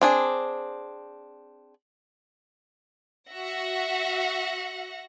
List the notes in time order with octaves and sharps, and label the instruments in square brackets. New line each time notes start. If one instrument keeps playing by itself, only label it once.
[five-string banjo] C4 D4 G#4
[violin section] F#4 E5 F#5 A#6